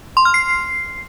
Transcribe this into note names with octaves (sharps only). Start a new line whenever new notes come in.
C6
F6
C7